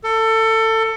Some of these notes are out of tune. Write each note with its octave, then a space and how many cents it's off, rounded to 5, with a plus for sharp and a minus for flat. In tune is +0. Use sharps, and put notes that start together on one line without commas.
A4 +25